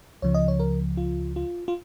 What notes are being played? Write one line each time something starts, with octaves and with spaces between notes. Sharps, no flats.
C#2 C#3 F3 C#5
D#5
C#5
A#4
F4
F4
F4